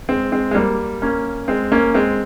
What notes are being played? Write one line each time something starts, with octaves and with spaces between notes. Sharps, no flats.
G#3 C4
G#3 C4
G#3
G3 A#3
A#3 C#4
G#3 C4
A#3 C#4
G#3 C4